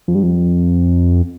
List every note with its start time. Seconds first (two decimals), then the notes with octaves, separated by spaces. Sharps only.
0.08 F2
0.15 G2
0.23 F2